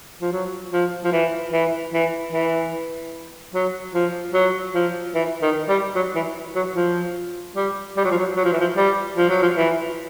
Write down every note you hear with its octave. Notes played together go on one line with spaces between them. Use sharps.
F3
F#3
F3
F3
E3
E3
E3
E3
F#3
F3
F#3
F3
E3
D#3
G3
F#3
E3
F#3
F3
G3
G3
F#3
F3
F#3
F#3
F3
E3
F3
G3
F3
F#3
F3
E3